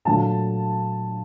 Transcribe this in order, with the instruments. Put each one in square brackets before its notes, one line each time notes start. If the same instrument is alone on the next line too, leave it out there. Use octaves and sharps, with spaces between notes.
[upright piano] A#2 F#3 A3 D4 F4 A5